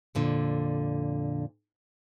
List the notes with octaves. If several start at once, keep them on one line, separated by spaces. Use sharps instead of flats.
F2 A#2 D3